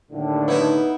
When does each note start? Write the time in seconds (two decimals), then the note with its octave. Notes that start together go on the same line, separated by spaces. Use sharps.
0.12 D#2 A2 D3
0.48 B3 D#4 E4